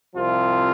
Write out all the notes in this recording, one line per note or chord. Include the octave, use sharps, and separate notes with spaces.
C2 C3 F3 F4